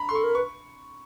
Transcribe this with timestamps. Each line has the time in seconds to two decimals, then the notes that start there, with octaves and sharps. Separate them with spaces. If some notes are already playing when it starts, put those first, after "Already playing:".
Already playing: A#5 B5
0.09 C6
0.11 A4 C#6
0.24 A#4
0.35 B4 C#6